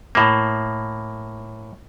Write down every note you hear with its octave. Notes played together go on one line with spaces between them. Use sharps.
A2 A#3